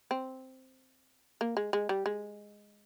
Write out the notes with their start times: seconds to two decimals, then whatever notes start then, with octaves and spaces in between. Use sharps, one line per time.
0.11 C4
1.41 A#3
1.57 G#3
1.73 G#3
1.89 G3
2.06 G#3